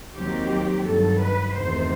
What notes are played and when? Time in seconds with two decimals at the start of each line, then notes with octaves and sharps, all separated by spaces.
0.16 D#2 D#3 F#3 C4 G4
0.85 G2 D#3 F#3 A4
1.19 B4
1.54 E2 C3 D#3 A3 C5